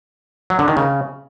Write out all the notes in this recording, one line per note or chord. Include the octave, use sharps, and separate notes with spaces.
F#3
D3
D#3
C#3